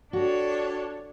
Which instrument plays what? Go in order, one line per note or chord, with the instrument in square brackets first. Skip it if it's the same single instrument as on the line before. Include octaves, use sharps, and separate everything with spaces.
[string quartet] D4 A4 C#5 [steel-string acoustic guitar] F#4 G4